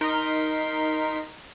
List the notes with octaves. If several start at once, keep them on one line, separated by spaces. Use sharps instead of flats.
D#4 A#4 C6 B6